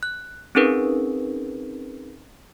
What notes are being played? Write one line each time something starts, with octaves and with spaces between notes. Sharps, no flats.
F#6
C4 C#4 D#4 G#4 A#4 B4